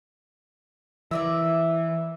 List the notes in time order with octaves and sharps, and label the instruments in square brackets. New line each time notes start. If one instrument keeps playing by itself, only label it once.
[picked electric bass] E3 [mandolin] A#4 D5 E5